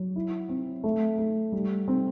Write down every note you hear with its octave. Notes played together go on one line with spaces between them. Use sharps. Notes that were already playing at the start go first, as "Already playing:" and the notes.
Already playing: F#3
E4
C4
A3
A3
G3
C4